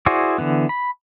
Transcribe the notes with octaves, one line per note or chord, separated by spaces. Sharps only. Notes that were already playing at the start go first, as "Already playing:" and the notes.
E4 F#4 G#4 C5 D5
D3 E3 B3
B5